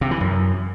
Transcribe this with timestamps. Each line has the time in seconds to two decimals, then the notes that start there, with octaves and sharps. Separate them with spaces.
0.01 C3
0.11 E3
0.21 F#2